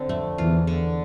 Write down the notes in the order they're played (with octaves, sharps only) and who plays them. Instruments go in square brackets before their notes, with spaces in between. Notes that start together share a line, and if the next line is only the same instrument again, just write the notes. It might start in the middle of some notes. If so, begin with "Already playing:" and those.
Already playing: [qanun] D3 C4
[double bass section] F2 [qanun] A3
[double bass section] E2 E3 [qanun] F4
[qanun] D3